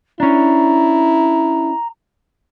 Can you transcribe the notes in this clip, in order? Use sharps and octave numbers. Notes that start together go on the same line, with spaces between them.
C#4 D4 E4 A#5